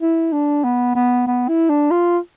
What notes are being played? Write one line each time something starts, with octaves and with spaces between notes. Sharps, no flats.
E4
D4
B3
B3
B3
E4
D4
F4